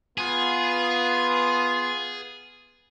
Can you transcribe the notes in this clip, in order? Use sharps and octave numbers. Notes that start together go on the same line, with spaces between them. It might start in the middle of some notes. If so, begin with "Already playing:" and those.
B3 F4 G#4